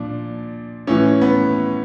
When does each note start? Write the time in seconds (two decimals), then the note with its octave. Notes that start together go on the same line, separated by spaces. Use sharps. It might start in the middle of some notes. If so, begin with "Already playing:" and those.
Already playing: A#2 F3 D4
0.87 A2 E3 C#4
1.21 B3